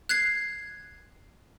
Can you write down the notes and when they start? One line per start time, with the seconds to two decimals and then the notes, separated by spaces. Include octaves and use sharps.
0.09 F#6 G#6 C7